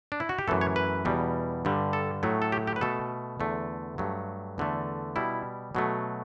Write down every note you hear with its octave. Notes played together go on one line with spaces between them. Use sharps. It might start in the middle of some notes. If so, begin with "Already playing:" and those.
D4
E4
F#4
G4
F#2 E3 A3 A4
C#5
B4
E2 B2 G3
G2 D3 G3
A4
A2 F#3 A3
A4
G4
G4
B4
B2 A3 A4
E2 D3 A3
G2 F#3 A3
E2 D3 A3
B2 G3 E4
B2 F#3 A3